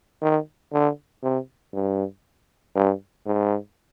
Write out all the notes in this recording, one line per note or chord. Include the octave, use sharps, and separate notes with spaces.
D#3
D3
C3
G2
G2
G#2